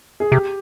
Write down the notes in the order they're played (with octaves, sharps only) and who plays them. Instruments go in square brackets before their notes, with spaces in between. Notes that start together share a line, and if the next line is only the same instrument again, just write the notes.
[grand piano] G#4
[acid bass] C3 [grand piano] G4